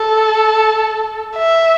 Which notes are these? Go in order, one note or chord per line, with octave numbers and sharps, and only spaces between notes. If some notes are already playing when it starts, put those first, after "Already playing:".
Already playing: A4
E5